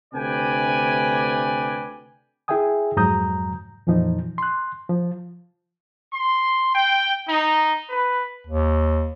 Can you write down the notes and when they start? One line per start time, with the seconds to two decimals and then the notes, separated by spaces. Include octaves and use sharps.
0.14 D2 C3 B4 D5 G5 G#5
2.48 E4 G#4 E5 G5 G#5 D#6
2.96 F2 G#2 F#3 A#5 D#6 G6
3.87 F2 A#2 E3 F3 D#4
4.38 C6 F#6
4.89 F3
6.12 C6
6.75 G5
7.29 D#4
7.89 B4
8.47 D#2